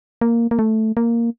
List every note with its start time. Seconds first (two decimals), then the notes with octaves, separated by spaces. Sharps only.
0.21 A#3
0.51 A#3
0.59 A3
0.97 A#3